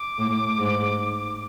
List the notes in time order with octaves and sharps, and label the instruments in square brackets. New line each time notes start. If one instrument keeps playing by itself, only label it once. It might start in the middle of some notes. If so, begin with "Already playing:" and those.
Already playing: [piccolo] D6
[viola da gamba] A2
G#2